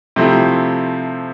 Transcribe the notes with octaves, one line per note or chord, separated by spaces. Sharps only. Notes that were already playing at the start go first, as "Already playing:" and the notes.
C3 F3 A3 C4 E4